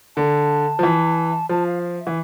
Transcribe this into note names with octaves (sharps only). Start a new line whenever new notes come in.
D3 A5
F3
E3
F3 A5
F5
F5
E5
E3